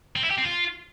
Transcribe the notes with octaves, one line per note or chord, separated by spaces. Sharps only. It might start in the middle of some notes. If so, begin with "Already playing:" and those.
C4
E4
G4
C4
F4